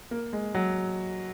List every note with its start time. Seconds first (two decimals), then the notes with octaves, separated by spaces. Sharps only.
0.11 A#3
0.33 G#3
0.55 F#3